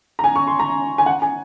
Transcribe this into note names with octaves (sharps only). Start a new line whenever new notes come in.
A#5
G#5
C#6
C6
A#5
G#5
F#5
G#5